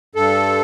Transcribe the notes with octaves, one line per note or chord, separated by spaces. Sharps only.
G2 A4